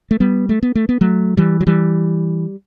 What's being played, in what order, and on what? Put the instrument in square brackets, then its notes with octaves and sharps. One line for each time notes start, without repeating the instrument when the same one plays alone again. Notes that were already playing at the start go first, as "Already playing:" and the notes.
[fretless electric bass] A3
G3 B3
A3
B3
A3
B3
F#3 A3
E3 G3
F#3
E3 G3